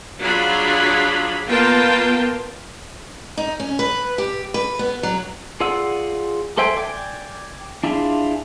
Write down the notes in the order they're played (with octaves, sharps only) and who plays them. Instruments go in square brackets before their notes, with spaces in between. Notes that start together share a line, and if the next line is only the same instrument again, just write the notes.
[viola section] F#3 D4 F4 G#4 B5
A#3 B3 F4 A#4 G5 A5
[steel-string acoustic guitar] D#4
C#4
B4
G4
B4
B3
F#3
[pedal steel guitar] F4 G#4 D5 F#5 E6
A4 C5 E5 G5 G#5
D5 G5 G#5
D4 E4 F4 G#4